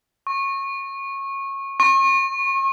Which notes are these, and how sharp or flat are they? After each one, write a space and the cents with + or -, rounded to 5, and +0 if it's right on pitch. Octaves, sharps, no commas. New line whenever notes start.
C#6 -20
C#6 -40